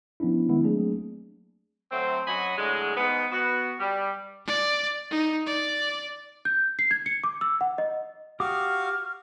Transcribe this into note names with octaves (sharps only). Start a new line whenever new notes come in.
F3 B3 C#4 D4 E4
D#3 G#3 B3 E4
F#3 A3 A#3 C4 D4 G#4
F#3 A3 C4
F#2 F#3 F#4 D#5 G#5 B5
A2 D3 F#3 G#3
G#2 B3
B3 F#4
G3
D5
D#4
D5
G6
C7
G#6
C#7
D6
E6
F#5
D#5
F#4 G4 F5 D6 D#6 F6